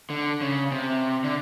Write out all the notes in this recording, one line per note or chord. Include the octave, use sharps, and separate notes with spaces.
D3
C#3
C3
D3